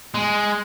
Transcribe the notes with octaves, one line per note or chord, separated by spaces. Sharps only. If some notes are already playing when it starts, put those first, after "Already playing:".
G#3